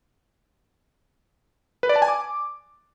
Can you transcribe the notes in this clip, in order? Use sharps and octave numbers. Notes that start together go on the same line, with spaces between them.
B4
D5
A5
G#5
D6